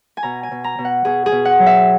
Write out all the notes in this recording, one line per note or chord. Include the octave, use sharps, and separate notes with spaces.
G#5
B2 A#5
G#5
B2
A#5
B2
F#5
B2 G#4
G#4
B2
F#5
F#3
E5